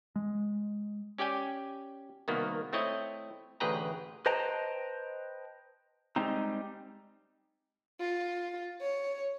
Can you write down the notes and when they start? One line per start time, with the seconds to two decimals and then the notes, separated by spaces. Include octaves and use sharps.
0.16 G#3
1.18 C#4 G4 D5 G5 G#5
2.28 C2 B2 D#3 A#3 B3
2.73 A3 C4 E4 C#5 D#5
3.60 A1 D2 G#4 B4 G5 A#5
4.26 B4 C5 D#5 G5 A5 A#5
6.16 G3 G#3 C4 D#4
8.01 F4
8.81 C#5